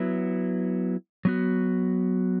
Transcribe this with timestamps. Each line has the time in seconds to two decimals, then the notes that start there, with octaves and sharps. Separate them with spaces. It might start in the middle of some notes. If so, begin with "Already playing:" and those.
Already playing: F#3 B3 E4
1.25 F#3 B3 F#4